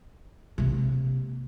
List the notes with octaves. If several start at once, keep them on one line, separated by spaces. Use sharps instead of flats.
C3 A#3